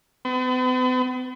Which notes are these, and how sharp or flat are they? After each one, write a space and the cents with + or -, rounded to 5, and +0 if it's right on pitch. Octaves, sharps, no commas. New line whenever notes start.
B3 +45